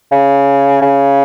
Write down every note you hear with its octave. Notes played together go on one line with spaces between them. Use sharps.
C#3
C#3